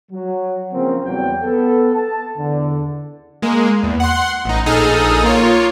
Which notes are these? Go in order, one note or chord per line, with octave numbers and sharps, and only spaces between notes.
F#3
C#3 F3 A#3 C4
E2 F#3 G3 G5
B3 A4
A5
E2 D3
G#3 A#3
E2
F#5 C6
A1 D#4
A#1 D#4 G#4 A4 D#6 F6
A#3 F4 C#5